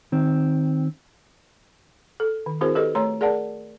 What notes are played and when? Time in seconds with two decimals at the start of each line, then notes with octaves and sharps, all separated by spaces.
0.12 D#3 C4
2.20 A4
2.46 D#3
2.61 C4 E4 F#4 G#4 A#4 C5
2.75 G4 A4 B4 D#5
2.95 A3 C#5 A#5 C6
3.21 G#4 A#4 D5 F#5 A5